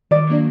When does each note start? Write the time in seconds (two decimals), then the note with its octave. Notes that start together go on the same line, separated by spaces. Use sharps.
0.11 D#3 D5
0.27 F#3 A#3 D4